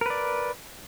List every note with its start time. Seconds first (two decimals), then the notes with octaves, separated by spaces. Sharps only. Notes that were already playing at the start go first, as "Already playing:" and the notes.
0.01 A#4
0.06 B4
0.10 D5